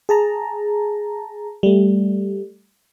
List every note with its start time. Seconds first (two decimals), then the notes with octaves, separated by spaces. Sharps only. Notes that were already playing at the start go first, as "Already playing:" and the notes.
0.09 G#4 A5 A#5
1.63 G3 A3